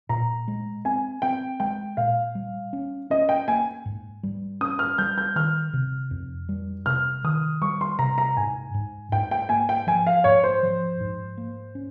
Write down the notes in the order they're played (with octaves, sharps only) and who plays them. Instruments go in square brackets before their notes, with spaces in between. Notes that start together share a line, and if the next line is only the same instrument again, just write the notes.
[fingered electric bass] A#2 [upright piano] A#5
[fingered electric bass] G#3
[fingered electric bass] C4 [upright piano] G#5
[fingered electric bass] C4 [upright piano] G5
[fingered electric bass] G#3 [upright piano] G5
[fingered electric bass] A#2 [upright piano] F5
[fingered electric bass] G3
C#4
[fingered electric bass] C#4 [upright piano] D#5
[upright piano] G5
[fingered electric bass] A#3 [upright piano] G#5
[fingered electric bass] G#2
G3
[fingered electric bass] C#4 [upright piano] D#6
[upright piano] F6
[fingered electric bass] G3 [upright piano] G6
[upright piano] G6
[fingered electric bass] D#3 [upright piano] F6
[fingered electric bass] C3
F2
G3
[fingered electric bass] C3 [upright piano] F6
[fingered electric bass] D#3 [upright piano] D#6
[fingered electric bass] G3 [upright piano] C#6
[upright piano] C6
[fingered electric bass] C3 [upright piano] A#5
[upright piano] A#5
[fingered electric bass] G#2 [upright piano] G#5
[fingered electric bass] G#2
[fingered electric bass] G#2 [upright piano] G5
[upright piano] G5
[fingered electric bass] A#3 [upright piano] G#5
[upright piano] G5
[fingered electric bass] F3 [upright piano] G#5
[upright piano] F5
[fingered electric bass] G#2 [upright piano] C#5
[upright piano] C5
[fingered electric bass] F3
G#2
A#3
C#4